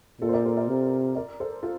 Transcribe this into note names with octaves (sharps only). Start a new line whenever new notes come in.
A#2 F4 A4
C5
A#4 D5
A4 C5
A#4 D5
C3
A#4 D5
A4 C5
F4 A4